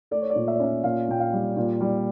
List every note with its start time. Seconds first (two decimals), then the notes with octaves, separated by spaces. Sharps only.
0.11 A3 D5
0.21 C#5
0.30 D5
0.35 A#2
0.48 E5
0.55 D5
0.60 C#4 E5
0.84 A#2 F5
1.08 A#2 G5
1.20 F5
1.33 G3
1.56 A#2
1.81 G3